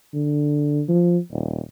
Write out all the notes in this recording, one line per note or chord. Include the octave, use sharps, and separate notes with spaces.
D3
F3
D#1